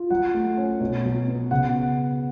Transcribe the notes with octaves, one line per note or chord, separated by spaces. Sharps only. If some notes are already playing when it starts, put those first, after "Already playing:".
Already playing: F4
F#3 F#5
A3
C#4
B2
F#3
B3
C#3 F#5